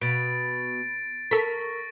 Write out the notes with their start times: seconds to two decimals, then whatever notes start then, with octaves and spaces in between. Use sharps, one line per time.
0.01 B2 A6 D7
1.31 A4 A#4 C#6 A#6 B6